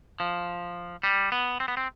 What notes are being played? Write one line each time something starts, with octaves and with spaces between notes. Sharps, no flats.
F3
G3
B3
C4
B3
C4